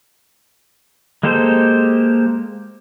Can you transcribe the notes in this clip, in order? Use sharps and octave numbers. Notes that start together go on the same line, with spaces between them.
G#3 A#3 G4 A4 C5